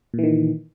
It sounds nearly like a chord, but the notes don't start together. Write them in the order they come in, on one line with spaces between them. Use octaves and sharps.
A#2 E3 D#3